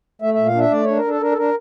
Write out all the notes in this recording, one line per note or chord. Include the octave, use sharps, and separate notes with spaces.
A3 E5
A#2 E5
F5
D4 E5
A3 D5
D4 C#5
A#4
D4 A4
D4 A#4
A4
D4 A#4